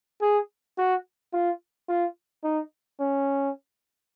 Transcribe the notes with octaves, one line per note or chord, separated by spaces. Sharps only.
G#4
F#4
F4
F4
D#4
C#4